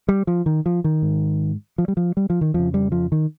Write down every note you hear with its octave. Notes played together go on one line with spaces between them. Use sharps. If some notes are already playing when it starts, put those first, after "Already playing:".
G3
F3
D#3
F3
D#3
G#2
F3
G3
F3
G3
F3
D#3
F2 C#3 F3
G3
F3
D#3